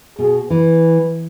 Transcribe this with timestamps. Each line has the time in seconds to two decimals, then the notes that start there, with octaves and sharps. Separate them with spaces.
0.19 B2 G#4
0.50 E3 B4